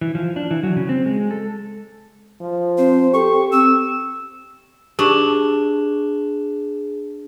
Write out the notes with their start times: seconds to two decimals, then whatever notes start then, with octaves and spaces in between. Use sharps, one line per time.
0.01 E3
0.15 F3
0.36 D4
0.51 E3
0.63 F#3
0.76 C#3
0.89 C4
1.05 G#3
1.31 A4
2.41 F3
2.78 C4 C5
3.14 G4 A4 C#6
3.52 C4 E6
4.99 D4 G4 G#4 A5 C#6